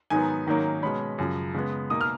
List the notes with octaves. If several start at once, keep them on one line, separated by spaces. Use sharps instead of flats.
G#2 D#3 F#3 B3 G#5
G#2 D#3 F#3 A#3 C#4
B2 G#3 C#4 B5
F#2 C#3 F3
C#3 G#3 B3
B2 A#3 D#4 D#6
F6